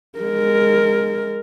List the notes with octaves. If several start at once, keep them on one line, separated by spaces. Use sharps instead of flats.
G#3 A#4